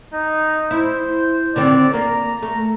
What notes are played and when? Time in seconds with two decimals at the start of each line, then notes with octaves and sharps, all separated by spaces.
0.14 D#4
0.71 E4 C5
1.56 D3 D#3 C4 D5
1.94 A#3 A#5
2.42 A3